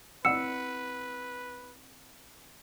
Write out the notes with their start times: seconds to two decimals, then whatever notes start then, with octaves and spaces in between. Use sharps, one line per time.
0.25 C4 E4 B4 F#5 E6 C#7